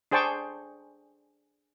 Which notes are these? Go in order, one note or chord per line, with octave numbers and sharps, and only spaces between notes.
D4 G#4 C5 G5 A5 C#6